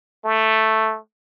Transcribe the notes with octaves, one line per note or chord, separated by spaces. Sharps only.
A3